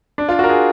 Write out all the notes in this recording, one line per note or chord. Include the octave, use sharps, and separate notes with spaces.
D4
F4
F#4
A#4
G#4